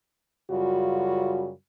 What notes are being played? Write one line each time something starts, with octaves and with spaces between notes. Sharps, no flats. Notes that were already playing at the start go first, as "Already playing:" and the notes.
F#2 C#3 G3 F4 F#4